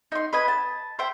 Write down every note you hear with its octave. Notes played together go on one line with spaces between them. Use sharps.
D#4 C6
B4 D#5 G#5
A5
C5 E5 G5